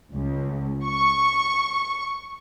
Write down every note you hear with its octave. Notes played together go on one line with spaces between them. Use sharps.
C#2
C#6